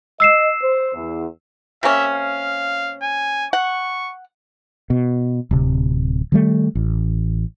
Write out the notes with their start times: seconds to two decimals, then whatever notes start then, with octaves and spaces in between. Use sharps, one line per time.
0.20 D#5 E6 C7 E7
0.62 C5
0.94 E2
1.83 C3 A#3 C#4 E5
2.15 F5
3.03 G#5
3.53 F#5 C#6
4.90 B2
5.51 D1 C3
6.32 D#3 G3 A3
6.75 A1